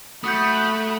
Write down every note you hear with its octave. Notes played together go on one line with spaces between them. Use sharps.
A3 F#4 B5 D#6 G6